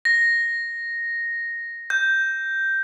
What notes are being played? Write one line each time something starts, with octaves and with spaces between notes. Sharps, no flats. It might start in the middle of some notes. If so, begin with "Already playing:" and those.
A#6
G6